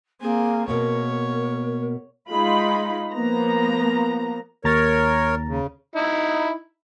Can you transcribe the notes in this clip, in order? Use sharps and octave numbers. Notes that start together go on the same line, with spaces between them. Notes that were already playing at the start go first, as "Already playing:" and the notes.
A#3 C4 G#4
B2 A#3 B3 A#4 C#5
G#3 D#4 F4 B5
F3 A#3 B3 A#5
D#2 A#4 C#5 A#5 A6
C#3
D#4 E4